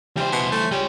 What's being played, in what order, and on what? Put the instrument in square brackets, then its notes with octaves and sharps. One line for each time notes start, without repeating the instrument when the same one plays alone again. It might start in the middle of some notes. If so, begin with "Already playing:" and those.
[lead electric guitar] E3 C5 [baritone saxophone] G3
[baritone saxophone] B2
A3
[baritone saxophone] G3 [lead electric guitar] G#3 C#5